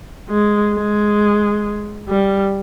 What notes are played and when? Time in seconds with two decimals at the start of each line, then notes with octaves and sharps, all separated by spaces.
0.29 G#3
0.75 G#3
2.09 G3